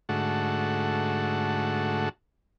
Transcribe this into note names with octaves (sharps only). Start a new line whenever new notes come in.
G#2 D3 A3 F#4